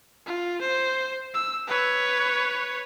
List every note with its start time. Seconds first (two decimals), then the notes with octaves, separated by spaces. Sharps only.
0.26 F4
0.61 C5
1.34 E6
1.67 B4 C#5